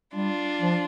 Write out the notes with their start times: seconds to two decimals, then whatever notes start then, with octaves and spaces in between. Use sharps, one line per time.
0.14 G3 D4 F4
0.61 F3